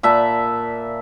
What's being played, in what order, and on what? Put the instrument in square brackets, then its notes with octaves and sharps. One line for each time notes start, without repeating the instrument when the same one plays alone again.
[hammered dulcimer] A#2 E5 A5 B5